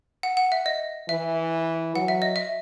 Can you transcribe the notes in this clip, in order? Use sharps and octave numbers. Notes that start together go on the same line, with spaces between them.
F#5
F#5
E5
D#5
E3 E5
F#3 F#5
E5
D#5
E5